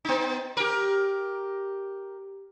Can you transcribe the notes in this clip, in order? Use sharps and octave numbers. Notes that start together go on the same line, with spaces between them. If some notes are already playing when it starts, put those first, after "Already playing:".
B3 D#4
G4 A#4